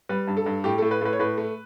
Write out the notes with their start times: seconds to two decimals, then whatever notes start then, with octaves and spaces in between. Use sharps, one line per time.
0.09 G3 B4
0.27 G2
0.37 A4
0.46 G2
0.64 A2 G4
0.78 A2 A4
0.91 B4
1.01 A2 B4
1.13 C#5
1.19 A2 B4
1.37 A3